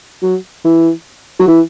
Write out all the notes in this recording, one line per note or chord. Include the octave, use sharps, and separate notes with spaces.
F#3
E3
F#3
E3